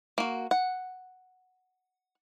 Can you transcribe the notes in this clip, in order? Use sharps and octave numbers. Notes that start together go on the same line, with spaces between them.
A#3 F#4
F#5